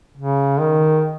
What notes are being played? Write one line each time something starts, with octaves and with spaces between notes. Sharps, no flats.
C#3
D#3